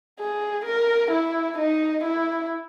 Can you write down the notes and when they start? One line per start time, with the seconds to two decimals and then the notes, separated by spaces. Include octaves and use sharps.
0.20 G#4
0.65 A#4
1.11 E4
1.58 D#4
2.04 E4